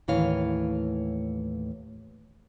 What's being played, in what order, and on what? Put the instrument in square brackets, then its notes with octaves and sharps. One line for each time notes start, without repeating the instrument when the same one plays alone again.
[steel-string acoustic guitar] D#2 A2 E3 C#5 F5